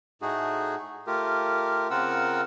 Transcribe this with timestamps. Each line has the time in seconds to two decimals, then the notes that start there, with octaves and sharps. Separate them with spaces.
0.22 A2 A3 D#4 F#4 G#4
1.07 A3 F4 G4 A#4
1.91 C#3 C4 F4 A#4 F#5 E6